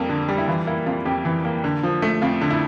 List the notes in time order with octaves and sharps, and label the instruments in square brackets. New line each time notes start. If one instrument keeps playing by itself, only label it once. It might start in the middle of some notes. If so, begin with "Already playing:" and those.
Already playing: [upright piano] F2 G3 A#3
D3
G3
E4
E3 F4
A#3 E4
F2 F4
F2 G4
E3
A#3
D3
F3
A3
F2 F4
D3
E4